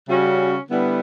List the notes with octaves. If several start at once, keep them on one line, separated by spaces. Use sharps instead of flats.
C#3 G3 C#4 F#4
D3 G3 B3 E4